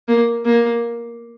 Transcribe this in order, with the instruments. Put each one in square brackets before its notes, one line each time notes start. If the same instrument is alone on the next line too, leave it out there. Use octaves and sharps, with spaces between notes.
[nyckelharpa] A#3
A#3